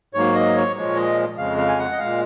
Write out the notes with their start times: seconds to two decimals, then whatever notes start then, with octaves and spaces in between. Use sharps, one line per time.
0.14 G#2 F#3 A#3 C#5
0.35 D#5
0.56 C#5
0.76 A#2 F3 G#3 C#5
0.96 D#5
1.38 F2 C#3 G#3 F5
1.57 F5
1.68 G#5
1.78 F#5
1.92 D#5
1.98 A#2 G#3 F5